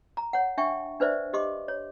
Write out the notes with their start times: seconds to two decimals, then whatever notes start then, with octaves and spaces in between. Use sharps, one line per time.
0.17 A#5
0.33 C#5 F#5
0.58 D4 E5 G5 G#5 C#6
1.00 D4 B4 C5 D5 E5
1.33 G4 D#5 C6 D6
1.68 C#5